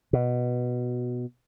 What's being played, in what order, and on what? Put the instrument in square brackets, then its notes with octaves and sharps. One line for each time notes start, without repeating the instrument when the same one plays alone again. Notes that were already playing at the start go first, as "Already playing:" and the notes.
[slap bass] B2